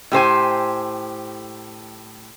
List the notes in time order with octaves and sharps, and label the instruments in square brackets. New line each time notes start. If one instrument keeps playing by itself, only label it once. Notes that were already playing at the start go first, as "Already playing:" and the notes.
[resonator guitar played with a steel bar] A2 G4 C5 G#5